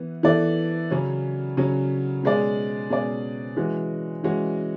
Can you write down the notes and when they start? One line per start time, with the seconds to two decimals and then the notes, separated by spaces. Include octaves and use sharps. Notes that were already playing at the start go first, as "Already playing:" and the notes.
Already playing: E3 B3 E4
0.23 E3 B3 E4 A4 D5
0.90 C#3 F#3 C#4
1.57 C#3 F#3 C#4
2.23 B2 G#3 C#4 G#4 D5
2.90 B2 G#3 C#4 G#4 D5
3.57 E3 G#3 C#4 F#4
4.24 E3 G#3 C#4 F#4